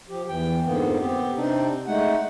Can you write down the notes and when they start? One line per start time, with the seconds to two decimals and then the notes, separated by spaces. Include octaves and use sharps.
0.09 F3 G4
0.29 E2 E3 G5
0.65 F2 G#2 D3 A#3 B3
0.99 B3 C4 G4
1.36 C3 C4 D4 D#4
1.87 G#3 A3 D#4 F#5